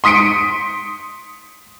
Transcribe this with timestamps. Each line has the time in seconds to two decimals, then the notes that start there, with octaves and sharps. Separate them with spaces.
0.04 C6 D#6 B6 C#7 D7